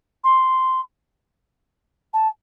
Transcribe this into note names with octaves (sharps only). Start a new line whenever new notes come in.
C6
A5